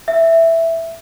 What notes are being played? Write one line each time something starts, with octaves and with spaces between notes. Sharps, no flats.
E5